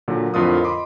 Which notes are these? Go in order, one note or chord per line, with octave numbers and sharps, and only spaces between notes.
A#2 D3 F#3
F2 A2 D3 F4 A#4 D#6
D#5 B5 C6 D6